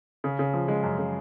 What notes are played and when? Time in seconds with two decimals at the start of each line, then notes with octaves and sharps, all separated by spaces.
0.24 C#3
0.39 C#3
0.54 F3
0.68 G#3
0.83 F#2
0.98 C#3